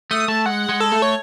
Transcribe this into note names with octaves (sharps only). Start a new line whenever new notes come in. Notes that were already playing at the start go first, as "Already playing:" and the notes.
A3 D#6
A3 A5
G#3 F#5
G#3
A4
A3
C#5